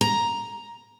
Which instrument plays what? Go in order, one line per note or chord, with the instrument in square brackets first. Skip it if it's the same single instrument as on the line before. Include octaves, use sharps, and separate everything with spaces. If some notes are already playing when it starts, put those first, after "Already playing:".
[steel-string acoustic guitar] A#5